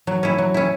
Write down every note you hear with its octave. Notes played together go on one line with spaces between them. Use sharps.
F#3
C#4 E4
F#3
C#4 E4